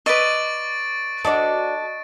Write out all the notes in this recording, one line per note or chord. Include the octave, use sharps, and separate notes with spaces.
B4 D5 D#5 C#6 D6 E6 A6 D7
D4 F#4 A4 D5 D#5 B5